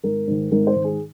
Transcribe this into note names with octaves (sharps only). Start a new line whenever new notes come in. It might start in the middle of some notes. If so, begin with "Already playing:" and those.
G#1 A#4
G#2 D#3
G#1 A#4
C5
G#2 D#3
G#4